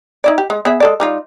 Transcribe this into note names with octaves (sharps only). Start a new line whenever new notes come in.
D#4 E4 D5
G4
G#3
B3 G#4 E5
G#3 A4 D5
G3 D#4 F4